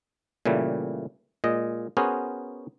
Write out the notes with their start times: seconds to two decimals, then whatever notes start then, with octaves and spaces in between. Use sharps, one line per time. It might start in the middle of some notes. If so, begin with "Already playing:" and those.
0.46 A#2 C#3 E3 G3 A3
1.44 A#2 G#3 D#5
1.97 B3 C#4 F#4 G#4 A#4 C5